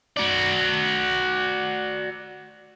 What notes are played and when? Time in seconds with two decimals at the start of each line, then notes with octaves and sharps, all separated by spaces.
0.17 F#4 D5